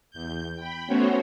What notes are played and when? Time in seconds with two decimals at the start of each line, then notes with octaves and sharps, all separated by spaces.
0.11 E2 G6
0.55 G5 B5
0.87 A3 B3 C#4 F#4 C5 C#5